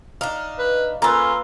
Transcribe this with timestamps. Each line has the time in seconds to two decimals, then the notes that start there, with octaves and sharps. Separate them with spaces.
0.21 D4 D#4 F5
0.59 B4
1.02 A#3 C#4 F4 A4 B4